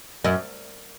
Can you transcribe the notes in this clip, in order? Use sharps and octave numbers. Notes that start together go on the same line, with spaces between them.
F#2